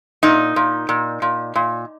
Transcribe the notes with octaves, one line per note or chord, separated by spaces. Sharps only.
A#2 D#4
A#2
A#2
A#2
A#2